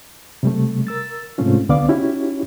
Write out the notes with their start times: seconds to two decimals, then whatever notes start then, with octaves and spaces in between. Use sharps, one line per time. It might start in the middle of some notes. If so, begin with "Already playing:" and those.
0.43 C3 G3 A3
0.87 A#4 E6 A6
1.38 G#2 C3 A3 C4 C#4 F4
1.69 C2 D3 B3 D5 F5 D6
1.89 C#4 D#4 E4 F#4 G4 C#5